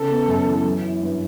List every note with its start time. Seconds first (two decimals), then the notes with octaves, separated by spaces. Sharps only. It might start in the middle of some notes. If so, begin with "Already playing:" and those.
Already playing: C#3 A4
0.10 B3
0.28 F#2
0.46 E3
0.65 F#3
0.84 E4
1.02 G2